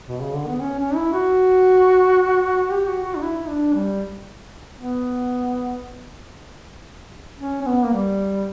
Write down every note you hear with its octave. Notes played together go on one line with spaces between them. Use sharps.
B2
C#3
D3
B3
C#4
C#4
E4
F#4
G4
F#4
F#4
D4
E4
E4
D4
G3
B3
C#4
C#4
B3
A#3
G3